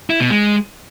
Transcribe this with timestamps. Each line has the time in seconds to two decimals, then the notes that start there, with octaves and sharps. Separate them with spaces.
0.10 E4
0.20 B2
0.30 G#3